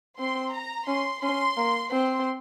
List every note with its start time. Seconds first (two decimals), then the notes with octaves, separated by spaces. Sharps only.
0.19 C4 C6
0.54 A#5
0.87 C#4 C6
1.22 C#4 C6
1.57 A#3
1.91 C4 C6